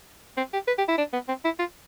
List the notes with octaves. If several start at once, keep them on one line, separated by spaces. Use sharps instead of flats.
C4
G4
B4
G4
E4
D4
B3
C4
E4
F4